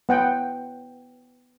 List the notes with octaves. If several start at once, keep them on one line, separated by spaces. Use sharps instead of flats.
B3 F#5 G5